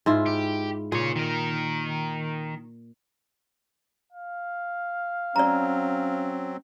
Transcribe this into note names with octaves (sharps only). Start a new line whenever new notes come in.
G#2 E4 F4
G4
A#2 G#4 C#5
D#3 A#4
F5
F#3 C4 C#4 D5 A#5